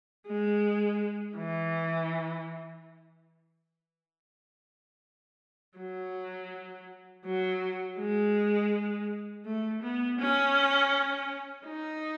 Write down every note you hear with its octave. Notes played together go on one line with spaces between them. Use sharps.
G#3
E3
F#3
F#3
G#3
A3
B3
C#4
D#4